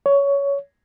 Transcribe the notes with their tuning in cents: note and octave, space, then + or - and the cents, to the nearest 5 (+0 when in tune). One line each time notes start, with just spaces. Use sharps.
C#5 +15